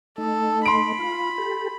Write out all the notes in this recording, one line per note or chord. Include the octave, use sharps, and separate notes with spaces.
A3 D#4 A4
B5 C6 D7
F4
G4 A4